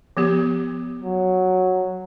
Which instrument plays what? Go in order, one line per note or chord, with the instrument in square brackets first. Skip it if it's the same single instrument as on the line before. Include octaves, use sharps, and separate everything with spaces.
[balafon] F3 B3 G4
[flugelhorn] F#3